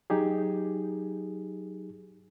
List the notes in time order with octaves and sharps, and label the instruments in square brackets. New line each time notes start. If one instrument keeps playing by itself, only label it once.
[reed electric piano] F#3 D#4 G4 G#4